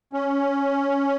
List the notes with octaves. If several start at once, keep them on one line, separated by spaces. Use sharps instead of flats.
C#4